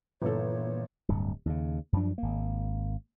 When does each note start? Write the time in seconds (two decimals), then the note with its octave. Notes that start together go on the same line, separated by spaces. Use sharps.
0.22 G1 A#2 E3 A4 C#5
1.09 D1 G2
1.46 D#2 C#3
1.93 F#2 F3 D4
2.18 G#1 A#3